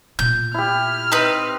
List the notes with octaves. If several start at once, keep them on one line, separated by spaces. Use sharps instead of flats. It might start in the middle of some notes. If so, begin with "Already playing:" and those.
A#2 B3 G6
E4 G4 F6
C4 D#4 B4